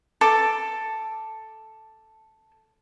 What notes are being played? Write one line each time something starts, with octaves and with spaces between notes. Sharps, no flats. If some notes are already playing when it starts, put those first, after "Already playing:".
A4 D6